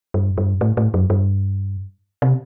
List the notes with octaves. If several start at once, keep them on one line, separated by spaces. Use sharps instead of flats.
G2
G2
A2
A2
F#2
G2
C3